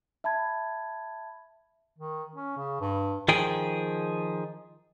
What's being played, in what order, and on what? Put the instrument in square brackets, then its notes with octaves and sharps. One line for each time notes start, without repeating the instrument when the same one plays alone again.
[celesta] E5 A5 B5 G#6
[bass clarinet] D#3
C#4
C#3
G2
[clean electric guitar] D#3 F3 G#4 G5